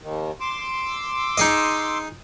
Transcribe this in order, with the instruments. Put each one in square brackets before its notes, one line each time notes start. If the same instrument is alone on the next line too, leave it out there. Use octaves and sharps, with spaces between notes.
[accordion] D#2 D#3
C6 D6 E6
[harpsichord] D#4 G#4 D#5